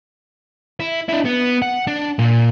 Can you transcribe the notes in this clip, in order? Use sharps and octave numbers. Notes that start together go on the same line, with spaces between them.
E4
D4 E4
B3
F#5
D4
A#2